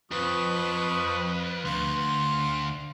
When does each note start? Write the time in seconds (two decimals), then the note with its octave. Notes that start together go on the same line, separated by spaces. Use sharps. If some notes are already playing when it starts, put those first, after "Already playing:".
0.12 F2 F3 B4 C#6 D#6
1.65 D2 F5 C6